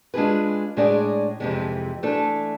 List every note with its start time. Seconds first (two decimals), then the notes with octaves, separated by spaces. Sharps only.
0.14 G#3 D4 F4 G#4 B4
0.77 A2 G#3 D4 G#4 D5
1.40 F2 C3 E3 G#3
2.03 E3 A3 D4 A4